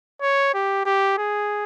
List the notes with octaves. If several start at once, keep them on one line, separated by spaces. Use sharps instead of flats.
C#5
G4
G4
G#4